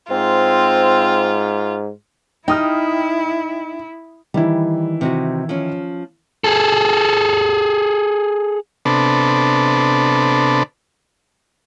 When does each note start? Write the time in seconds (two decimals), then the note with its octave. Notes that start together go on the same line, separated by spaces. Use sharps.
0.11 G#2 C4 F4
2.48 D#4 E4 G5 D#6 F6
4.34 D#3 E3 G3 E4
5.01 C3 D#4 F#4
5.49 F3 C#4
6.44 G#4 A4
8.85 C3 B3 D4 A4